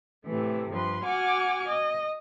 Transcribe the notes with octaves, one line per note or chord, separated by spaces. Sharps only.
A2 C3 E3 A3
G2 F3 B4 C6
F#4 F#5 G#5 D6 F6
D#5